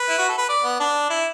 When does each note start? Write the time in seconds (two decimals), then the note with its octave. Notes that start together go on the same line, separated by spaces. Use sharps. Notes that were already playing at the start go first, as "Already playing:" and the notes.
Already playing: B4
0.09 E4
0.18 F#4
0.29 A4
0.38 B4
0.49 D5
0.63 B3
0.80 D4
1.10 E4